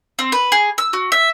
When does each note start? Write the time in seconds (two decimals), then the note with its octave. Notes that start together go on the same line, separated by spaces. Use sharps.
0.19 C4
0.32 B4
0.52 G#4
0.78 E6
0.93 F#4
1.12 E5